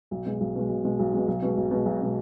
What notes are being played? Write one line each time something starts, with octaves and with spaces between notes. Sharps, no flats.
B1
B2 G#3
B1
B2 G#3
B1
B2 G#3
B1
B2 G#3
B1
B2 G#3
B1
B2 G#3
B1
B2 G#3